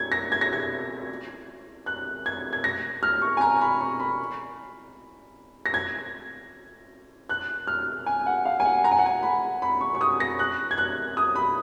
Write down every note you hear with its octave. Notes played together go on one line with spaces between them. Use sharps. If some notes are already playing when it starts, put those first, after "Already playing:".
Already playing: G#6
A#6
G#6
A#6
G#6
F#6
G#6
G#6
A#6
F6
C#6
G#5
A#5
B5
C#6
B5
A#6
G#6
F#6
F6
G#5
F#5
F5
G#5
F#5
A#5
G#5
F#5
G#5
B5
B5
C#6
C#6
D#6
A#6
F#6
G#6
F#6
D#6
B5